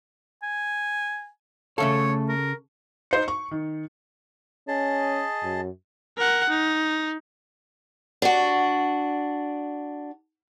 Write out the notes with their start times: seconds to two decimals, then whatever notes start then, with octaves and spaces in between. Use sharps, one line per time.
0.43 G#5
1.78 C#3 A3 A4 C#5 E5 F5
2.28 A#4
3.11 D#4 C5 C#7
3.28 C#6
3.51 D#3
4.68 C#4 G#4 D#5 A5
5.44 F#2
6.18 A#4 F#5
6.49 D#4
8.22 D4 F#4